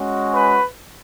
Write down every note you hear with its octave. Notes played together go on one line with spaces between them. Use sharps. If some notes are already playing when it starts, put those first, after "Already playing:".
Already playing: G#3 C#4 F#4
B4